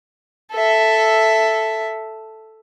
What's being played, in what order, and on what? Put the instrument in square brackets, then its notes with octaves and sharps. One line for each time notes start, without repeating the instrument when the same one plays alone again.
[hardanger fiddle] A4 E5